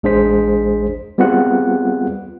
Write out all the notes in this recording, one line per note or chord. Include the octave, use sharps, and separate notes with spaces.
A1 G#3 D4 G#4 C5 B6
G3 B3 C4 F4 G#4 F#5